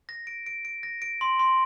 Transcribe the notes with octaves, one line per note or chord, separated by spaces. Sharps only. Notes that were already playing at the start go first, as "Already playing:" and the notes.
A#6
D7
D7
D7
A#6
D7
C6
C6